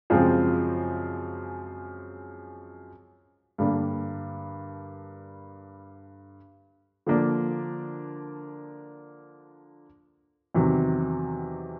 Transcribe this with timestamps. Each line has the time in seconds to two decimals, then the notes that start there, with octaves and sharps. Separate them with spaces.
0.10 F#2 C#3 F3 G#3 C4
3.58 G2 D3 G3 A#3 D4
7.06 D3 F3 A#3 D4
10.54 E2 C3 D#3 F#3